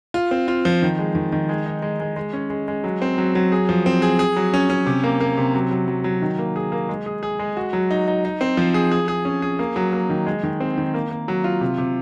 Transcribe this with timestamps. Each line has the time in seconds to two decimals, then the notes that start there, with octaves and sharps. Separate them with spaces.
0.14 F4
0.31 C4
0.48 F4
0.65 F3
0.82 D#3
0.99 G#3
1.15 D#3
1.32 D#3
1.49 G#3
1.66 D#4
1.82 G#3
2.00 G#3
2.16 G#3
2.33 C#4
2.50 G#3
2.68 G#3
2.84 F#3
3.02 C4
3.18 F#3
3.35 F#3
3.52 G#4
3.69 F3
3.86 C4
4.02 G#4
4.19 G#4
4.36 F#3
4.54 C#4
4.70 C#4
4.86 C3
5.04 A#3
5.21 A#3
5.38 C3
5.54 F#3
5.71 F#3
5.88 F#3
6.04 F#3
6.22 D#3
6.39 A#3
6.56 G#4
6.72 A#3
6.89 G#3
7.06 G#4
7.23 G#4
7.39 G#3
7.57 F#4
7.73 F#3
7.91 D#4
8.08 D#4
8.25 D#4
8.41 C4
8.57 F3
8.74 G#4
8.91 G#4
9.08 G#4
9.25 C#4
9.42 G#4
9.59 A#3
9.76 F#3
9.93 A#3
10.10 D#3
10.27 G#3
10.43 D#3
10.60 C4
10.78 D#3
10.94 A#3
11.11 A#3
11.28 F#3
11.44 F4
11.61 C3
11.78 C3